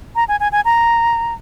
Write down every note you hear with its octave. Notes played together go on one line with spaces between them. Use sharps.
A#5
G#5
G#5
G#5
A#5